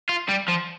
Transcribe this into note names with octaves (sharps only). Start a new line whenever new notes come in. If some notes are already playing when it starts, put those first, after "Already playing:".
F4
G3
F3